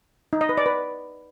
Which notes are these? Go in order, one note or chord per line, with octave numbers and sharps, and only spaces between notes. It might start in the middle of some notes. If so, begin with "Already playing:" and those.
D#4
D#5
B4
D5
B4